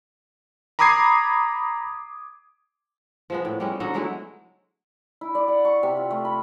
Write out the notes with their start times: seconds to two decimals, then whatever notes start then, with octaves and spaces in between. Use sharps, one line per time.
0.79 A#5 B5 D6 D#6 G#6 C7
3.30 F3 G#3 B3
3.45 A2
3.60 G3 G#3 C#4
3.80 D3 F#3 D#4
3.94 F#3 G#3 A3 E4
5.21 E4
5.35 D5
5.48 F#5
5.65 C#6
5.83 C3
5.97 F4
6.11 A3
6.25 B5